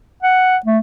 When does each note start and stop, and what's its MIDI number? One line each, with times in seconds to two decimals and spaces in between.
0.23 0.57 78
0.66 0.79 57